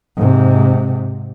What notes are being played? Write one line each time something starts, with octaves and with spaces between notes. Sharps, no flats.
G#2 C3